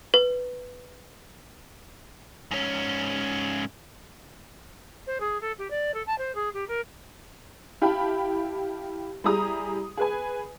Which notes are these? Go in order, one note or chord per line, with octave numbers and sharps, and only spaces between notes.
B4
G#2 C#4
C5
G#4
A4
G4
D5
A4
A5
C5
G#4
G4
A#4
E4 G4 F5 G5 A5 B5
G3 E4 G#4 A#5 D#6
G#4 B4 G#5